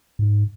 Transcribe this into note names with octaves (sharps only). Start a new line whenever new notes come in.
G#2